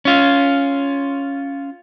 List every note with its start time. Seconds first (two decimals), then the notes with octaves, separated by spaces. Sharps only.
0.05 C#4 F4